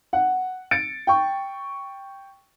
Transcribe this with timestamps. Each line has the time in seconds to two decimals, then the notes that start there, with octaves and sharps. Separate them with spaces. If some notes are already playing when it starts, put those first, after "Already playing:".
0.13 F#5
0.71 A6 C#7 D7
1.07 G5 C#6